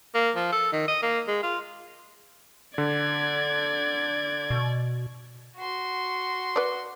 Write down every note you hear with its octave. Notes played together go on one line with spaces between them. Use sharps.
A#3
F3
A4
D#3
D#5
A#3
G#3
F4
D3 D5 G#6
B2
F#4 C6
B4 D5